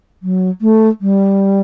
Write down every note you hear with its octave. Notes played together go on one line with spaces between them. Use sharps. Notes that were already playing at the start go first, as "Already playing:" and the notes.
F#3
A3
G3